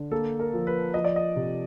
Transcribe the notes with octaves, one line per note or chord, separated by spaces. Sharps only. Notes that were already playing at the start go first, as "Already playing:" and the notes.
Already playing: D3
A#3 A4
A#4
F3
B4
F3 D#5
D5
D#5
C3